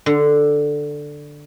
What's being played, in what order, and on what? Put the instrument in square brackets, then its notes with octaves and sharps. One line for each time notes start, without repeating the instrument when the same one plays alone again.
[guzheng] D3